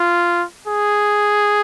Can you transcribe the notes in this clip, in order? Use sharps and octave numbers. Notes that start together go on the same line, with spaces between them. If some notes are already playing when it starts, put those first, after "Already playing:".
Already playing: F4
G#4